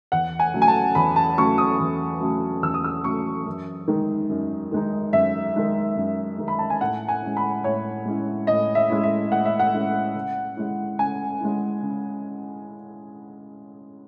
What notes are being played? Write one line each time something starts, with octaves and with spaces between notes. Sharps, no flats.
E2 F#5
G#5
C#3 F#3 A3
G#5
A5
E2 B5
A5
C#3 F#3 A3 C#6
D#6
E2
C#3 F#3 A3
E2 E6
D#6
E6
C#3 F#3 A3 C#6
F#2
D#3 G#3 D#4
F#2
D#3 G#3 D#4
F#2 E5
D#3 G#3 D#4
F#2
D#3 G#3 D#4
B5
A5
G#5
A2 F#5
G#5
G#3 C#4 E4
B5
A2 C#5
G#3 C#4 E4
A2 D#5
E5
G#3 C#4 E4
E5
A2 F#5
E5
F#5
G#3 C#4 E4
C#3
G#3 C#4 E4
C#3 G#5
G#3 C#4 E4
C#3